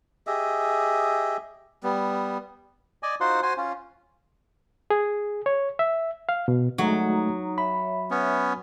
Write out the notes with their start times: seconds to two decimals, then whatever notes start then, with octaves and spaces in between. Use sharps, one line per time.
0.27 G4 G#4 D#5 E5
1.83 G3 B3
3.03 D5 D#5 G#5
3.21 D#4 F4 F#4 C5 F#5 C6
3.43 F#4 C5 G#5 C6
3.57 C#4 F4
4.90 G#4
5.46 C#5
5.79 E5
6.29 F5
6.48 B2
6.78 F#3 G#3 A3 D#4 F#4 A#5 D#6
7.58 C#5 E5 B5
8.11 B3 C#4